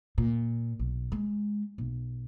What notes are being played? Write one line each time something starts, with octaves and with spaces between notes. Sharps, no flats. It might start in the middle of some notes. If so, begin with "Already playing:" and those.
A#2
B1
G#3
B1